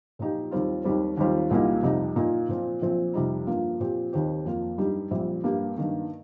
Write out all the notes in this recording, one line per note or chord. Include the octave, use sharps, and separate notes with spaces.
A#2 F3 D#4 G4
D#2 D#3 G3 C4 F4
D#2 D#3 G3 C4
D#2 D#3 G3 C4 F4
C2 A#2 G3 A#3 D#4
F2 C3 G3 D#4
A#2 A#3 D#4
A#2 F3 C4 F4
A#1 A#2 F3 C4
F2 C3 G3 D#4
G2 F3 A#3 F4
A#2 F3 C4 G4
D#2 D#3 C4 G4
F2 F3 A#3 F4
G2 G3 D#4 G4
A#1 A#2 G3 C4
G2 G3 A#3 G4
G2 D#3 A#3